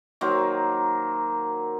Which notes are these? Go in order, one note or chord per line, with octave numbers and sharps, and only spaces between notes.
D#3 F#3 A#3 C5